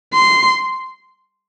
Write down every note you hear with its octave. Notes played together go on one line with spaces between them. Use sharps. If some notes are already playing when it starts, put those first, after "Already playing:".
C6